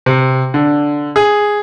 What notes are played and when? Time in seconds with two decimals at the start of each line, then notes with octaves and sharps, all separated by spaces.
0.06 C3
0.54 D3
1.16 G#4